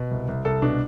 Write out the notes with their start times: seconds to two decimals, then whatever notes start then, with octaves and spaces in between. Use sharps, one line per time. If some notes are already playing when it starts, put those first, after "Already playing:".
Already playing: B2
0.11 C2
0.28 C2
0.45 C2 A4
0.62 B2 D4